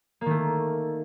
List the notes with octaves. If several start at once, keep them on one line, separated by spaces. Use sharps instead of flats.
D#3 A3 A#3